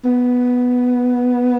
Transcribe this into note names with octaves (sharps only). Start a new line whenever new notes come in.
B3